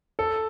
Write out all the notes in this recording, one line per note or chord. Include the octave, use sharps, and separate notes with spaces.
A4